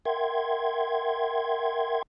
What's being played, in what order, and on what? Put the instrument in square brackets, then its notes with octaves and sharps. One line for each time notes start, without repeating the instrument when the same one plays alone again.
[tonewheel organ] A#4 E5 F#5 G5 C6 G#6